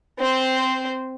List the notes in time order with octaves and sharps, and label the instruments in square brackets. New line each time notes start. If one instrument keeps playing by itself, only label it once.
[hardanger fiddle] C4 C5